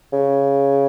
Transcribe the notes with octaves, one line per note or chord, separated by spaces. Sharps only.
C#3